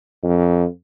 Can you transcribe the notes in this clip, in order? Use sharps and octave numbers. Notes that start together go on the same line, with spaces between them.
F2